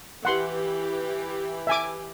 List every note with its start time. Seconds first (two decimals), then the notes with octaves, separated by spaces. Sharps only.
0.25 E3 G4 F#5 C6
1.67 E5 G#5 D6